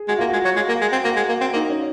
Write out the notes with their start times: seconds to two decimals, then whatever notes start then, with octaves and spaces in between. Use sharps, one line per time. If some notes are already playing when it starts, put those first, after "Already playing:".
Already playing: G#4
0.08 G#3 F#4
0.18 A#3 F4
0.28 F#4
0.33 G#3
0.45 F#3
0.56 G#3 F#4
0.69 A#3
0.81 G#3
0.92 C4
1.04 A#3 F#4
1.16 G#3
1.29 A#3
1.41 C4
1.53 A#3 D#4
1.69 C#4